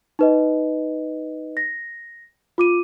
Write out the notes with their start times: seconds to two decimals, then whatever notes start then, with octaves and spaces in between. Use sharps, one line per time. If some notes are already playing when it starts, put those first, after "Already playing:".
0.19 D#4 B4 D#5
1.57 A#6
2.58 F4 D6 D#7